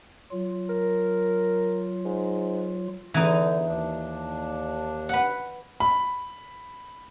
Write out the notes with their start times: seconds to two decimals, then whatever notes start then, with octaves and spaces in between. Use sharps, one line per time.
0.31 F#3 F4
0.69 A#4
2.05 G#2
3.14 E2 D3 E3 D#4
3.65 D#2 D4
5.09 B4 F#5
5.80 B5